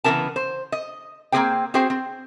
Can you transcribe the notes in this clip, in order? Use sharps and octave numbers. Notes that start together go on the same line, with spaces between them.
C#3 E3 B3 E4 A#4 A5
C5
D#5
A#3 C4 E4 G#4 C5 G5
C4 F#4 G#4 C5 G5
C4